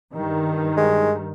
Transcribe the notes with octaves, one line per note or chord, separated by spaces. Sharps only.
G2 D#3
G#3